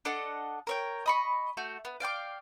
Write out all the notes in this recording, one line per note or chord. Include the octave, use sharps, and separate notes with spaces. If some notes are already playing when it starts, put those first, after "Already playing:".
D4 A4 D#5 F#5
A#4 C#5 G5
D#5 B5 C#6
A3 F#4 G6
B3
D5 F5 G5 D6